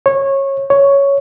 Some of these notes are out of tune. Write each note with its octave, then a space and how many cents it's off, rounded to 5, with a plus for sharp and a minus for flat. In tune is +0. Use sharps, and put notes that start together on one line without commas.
C#5 -20
C#5 +5